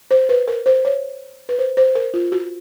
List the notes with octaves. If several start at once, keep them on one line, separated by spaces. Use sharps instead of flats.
C5
B4
A#4
C5
C#5
B4
C5
C5
A#4
F4
F#4